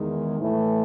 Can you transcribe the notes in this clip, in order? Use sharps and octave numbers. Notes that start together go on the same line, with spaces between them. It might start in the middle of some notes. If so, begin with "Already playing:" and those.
Already playing: E2 D#3 G#3
A2 E3 A3